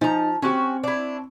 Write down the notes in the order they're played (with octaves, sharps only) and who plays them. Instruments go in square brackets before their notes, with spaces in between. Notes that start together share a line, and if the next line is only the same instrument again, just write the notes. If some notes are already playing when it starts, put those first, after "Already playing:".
[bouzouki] F3 A#5 [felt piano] D#4 G#5
[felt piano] C4 C#6 [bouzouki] C#4 F#4 G4
[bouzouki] D4 E4